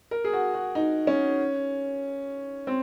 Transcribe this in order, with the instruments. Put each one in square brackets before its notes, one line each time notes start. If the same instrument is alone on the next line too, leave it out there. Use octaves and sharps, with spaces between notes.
[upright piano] A#4
G#4
F#4
F#4
D#4
C#4
C4